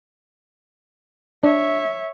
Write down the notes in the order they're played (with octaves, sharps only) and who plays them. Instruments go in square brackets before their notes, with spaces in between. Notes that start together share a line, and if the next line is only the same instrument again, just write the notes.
[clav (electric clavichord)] D4 [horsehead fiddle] C#5 E5